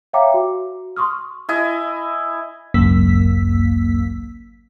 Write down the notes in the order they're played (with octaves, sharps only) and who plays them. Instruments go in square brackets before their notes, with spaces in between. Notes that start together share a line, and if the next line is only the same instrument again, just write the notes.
[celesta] C#5 E5 F5 G5 A#5 D6
F#4
C6 C#6 D#6 F6
[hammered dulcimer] E4 D#5 G#5
[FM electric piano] G#1 C#2 F#2 A#3 E6 B6